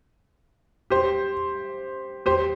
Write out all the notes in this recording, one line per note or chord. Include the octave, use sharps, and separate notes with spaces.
G4 C5
G4 C5